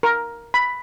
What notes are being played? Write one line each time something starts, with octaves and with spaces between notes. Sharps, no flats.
A#4
B5